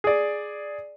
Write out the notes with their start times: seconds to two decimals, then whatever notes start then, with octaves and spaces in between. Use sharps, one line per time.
0.04 G#4 D5